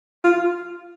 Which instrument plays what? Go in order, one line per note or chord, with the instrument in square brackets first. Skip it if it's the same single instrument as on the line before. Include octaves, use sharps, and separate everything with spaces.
[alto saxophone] F4